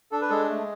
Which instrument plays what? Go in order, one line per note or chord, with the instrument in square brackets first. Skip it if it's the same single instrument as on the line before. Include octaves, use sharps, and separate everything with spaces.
[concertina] D4 A4
B4
G#3 A4
A3